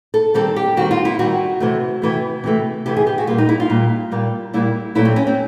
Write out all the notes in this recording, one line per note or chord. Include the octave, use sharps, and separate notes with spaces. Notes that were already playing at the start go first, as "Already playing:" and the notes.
A4
D#3 G3 C4 A4
G4
D#3 G3 C4 F#4
F4
E4
D#3 G3 C4 F#4
C3 E3 A3
C3 E3 A3
C3 E3 A3
C3 E3 A3 G4
G#4
G4
F#4
A#2 G3 A#3 F4
D#4
E4
F4
A#2 G3 A#3
A#2 G3 A#3
A#2 G3 A#3 E4
A#2 F#3 A3 C4 E4
C4
C#4
C4